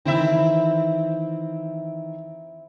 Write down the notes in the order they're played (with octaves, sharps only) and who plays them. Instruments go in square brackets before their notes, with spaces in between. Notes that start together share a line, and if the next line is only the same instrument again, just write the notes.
[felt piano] D#3 E3 [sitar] C4 E4 E5